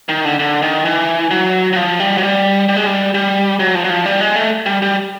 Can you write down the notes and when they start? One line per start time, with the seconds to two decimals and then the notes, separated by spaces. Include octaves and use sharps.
0.09 D#3
0.25 D3
0.39 D3
0.62 D#3
0.85 E3
1.31 F#3
1.73 F#3
1.76 F3
2.00 G3
2.18 F#3
2.23 G3
2.69 G3
2.76 G#3
2.86 G3
3.14 G3
3.60 F#3
3.75 F3
3.84 F#3
3.90 F3
4.06 G3
4.21 G#3
4.36 A3
4.66 G3
4.82 G3